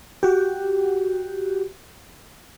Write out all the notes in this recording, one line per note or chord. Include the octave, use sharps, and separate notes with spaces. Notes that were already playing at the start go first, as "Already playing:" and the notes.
F#4 G4